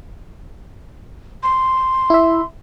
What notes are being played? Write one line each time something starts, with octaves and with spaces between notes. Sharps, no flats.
C6
E4 E5